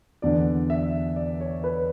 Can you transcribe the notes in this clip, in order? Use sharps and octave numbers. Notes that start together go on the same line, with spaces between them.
E2 D3 D5
E5
D5
C#5
B4